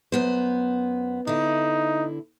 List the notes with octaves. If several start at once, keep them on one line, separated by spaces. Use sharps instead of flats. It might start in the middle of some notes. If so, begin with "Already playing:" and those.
F#2 B3 C5
D3 D#4 E4